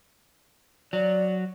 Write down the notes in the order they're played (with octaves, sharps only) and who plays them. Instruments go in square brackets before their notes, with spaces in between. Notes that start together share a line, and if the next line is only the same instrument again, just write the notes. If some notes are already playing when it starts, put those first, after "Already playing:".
[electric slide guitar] F#3 [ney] D5